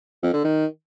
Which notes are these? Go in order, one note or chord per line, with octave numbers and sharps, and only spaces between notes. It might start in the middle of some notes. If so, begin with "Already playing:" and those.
F2
D3
D#3